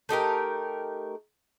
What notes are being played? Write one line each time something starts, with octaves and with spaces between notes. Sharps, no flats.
A3 D#4 G4 A#4